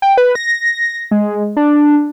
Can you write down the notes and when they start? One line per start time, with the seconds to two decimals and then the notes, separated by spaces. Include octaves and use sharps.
0.02 G5
0.18 B4
0.35 A#6
1.11 G#3
1.57 D4